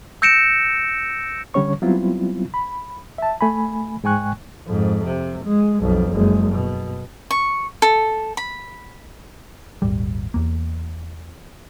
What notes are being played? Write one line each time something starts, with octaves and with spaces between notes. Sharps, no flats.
E6 G6 A#6 C#7 D7 E7
D3 G3 C#4 C#5 C#6
F#3 G3 B3 C4 E4 F4
B5
E5 A5
A3 G#5 B5
G#2 G#3 G5 G#5 C#6 F#6
F2 G#2
C3
G#3
B1 F2
F#1 G#3
B2
C#6
A4
B5
D#1 G#1 G3
E2 A#3